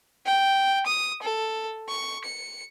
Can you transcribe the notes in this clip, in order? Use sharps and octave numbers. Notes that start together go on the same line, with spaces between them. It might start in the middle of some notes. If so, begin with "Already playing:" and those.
G5
D#6
A4
C#6
C#7